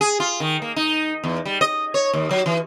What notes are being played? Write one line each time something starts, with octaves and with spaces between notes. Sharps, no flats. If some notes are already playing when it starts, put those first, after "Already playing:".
G#4
F4
D#3
A#3
D#4
E2
G3
D#5
C#5
D#2
F#3
E3